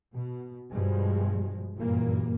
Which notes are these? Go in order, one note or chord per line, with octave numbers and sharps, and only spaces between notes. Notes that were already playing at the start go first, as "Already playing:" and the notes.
B2
G2 B2 F3 G#3
F#1 G2 A#2 E3 A#3